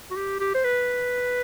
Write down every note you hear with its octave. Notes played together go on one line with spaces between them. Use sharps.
F#4
G4
G4
C5
B4